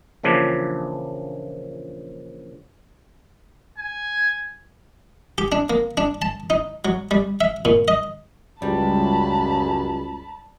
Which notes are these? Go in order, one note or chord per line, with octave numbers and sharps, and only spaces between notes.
A#1 A#2 C#3 E3 F3 D4
G#5
G4
D4
A#3
D4
A5
D#4
F#3
G3
E5
A#2
D#5
C#2 F#2 G3 A5 B5